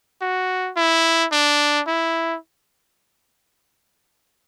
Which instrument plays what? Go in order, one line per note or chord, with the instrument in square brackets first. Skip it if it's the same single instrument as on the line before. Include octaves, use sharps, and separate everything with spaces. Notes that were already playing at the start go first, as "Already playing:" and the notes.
[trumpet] F#4
E4
D4
E4